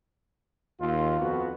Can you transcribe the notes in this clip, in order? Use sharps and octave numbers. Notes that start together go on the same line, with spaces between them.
D#2 F4
F2 B3 F#4